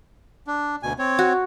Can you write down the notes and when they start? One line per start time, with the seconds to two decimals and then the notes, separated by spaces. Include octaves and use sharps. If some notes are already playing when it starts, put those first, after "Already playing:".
0.47 D4
0.83 D2 B2 G#5
0.99 C4 C#5
1.19 F#4